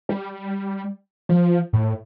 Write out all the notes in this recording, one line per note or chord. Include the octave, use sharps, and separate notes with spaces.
G3
F3
A2